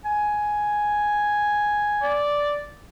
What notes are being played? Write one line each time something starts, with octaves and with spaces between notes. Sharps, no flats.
G#5
D5